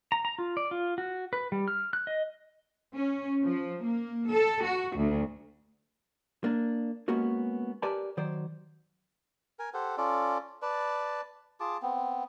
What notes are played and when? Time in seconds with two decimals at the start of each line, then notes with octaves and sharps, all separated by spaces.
0.12 A#5
0.25 A#5
0.39 F4
0.57 D5
0.71 F4
0.98 F#4
1.33 B4
1.52 G3
1.68 F6
1.93 F#6
2.07 D#5
2.96 C#4
3.44 F3
3.84 A#3
4.33 A4
4.65 F#4
4.96 D2
6.44 A#3 D4
7.08 G#3 A#3 B3 C#4 F#4 A#4
7.82 G4 A#4 B4 D5 G#5 A5
8.17 D#3 F#3 C5 D5
9.59 A#4 G#5
9.74 G4 A4 C5 F#5
9.98 C#4 F4 A4 D5
10.62 B4 D5 A5
11.60 F4 G#4 A5 D6
11.82 B3 C4